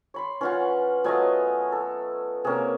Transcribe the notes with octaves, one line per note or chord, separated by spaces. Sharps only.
C#5 B5 C6
E3 C#4 F4 F#5
F#3 A3 B3 F4 D#5 G#5
A4
C3 A#3 C#4 G#4